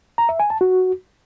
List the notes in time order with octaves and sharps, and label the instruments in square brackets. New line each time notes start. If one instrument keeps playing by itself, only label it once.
[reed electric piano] A#5
E5
G#5
A5
F#4